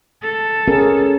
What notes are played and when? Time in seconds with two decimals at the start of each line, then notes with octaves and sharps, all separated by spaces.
0.23 A4
0.68 C#4 G#4 A#4